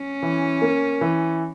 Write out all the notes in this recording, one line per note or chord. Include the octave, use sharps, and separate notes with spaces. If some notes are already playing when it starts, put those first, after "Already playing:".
Already playing: C#4
E3
A#3
E3